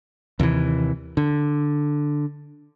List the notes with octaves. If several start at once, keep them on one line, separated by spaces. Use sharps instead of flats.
D#2 C3 D#3 E3
D3